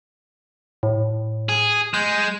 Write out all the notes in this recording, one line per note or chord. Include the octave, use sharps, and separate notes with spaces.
A2
G#4
G#3 G6